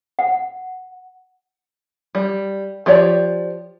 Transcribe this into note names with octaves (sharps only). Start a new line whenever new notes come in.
F#5
G3
F3 G4 C#5 D5